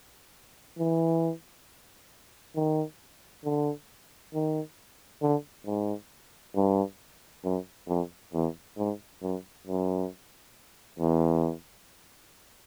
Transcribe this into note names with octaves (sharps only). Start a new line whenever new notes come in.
E3
D#3
D3
D#3
D3
G#2
G2
F#2
F2
E2
G#2
F#2
F#2
E2